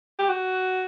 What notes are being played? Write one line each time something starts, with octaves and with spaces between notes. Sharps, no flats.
G4
F#4